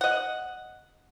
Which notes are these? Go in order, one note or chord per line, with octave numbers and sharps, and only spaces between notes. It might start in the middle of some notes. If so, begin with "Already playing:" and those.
D#5 F#5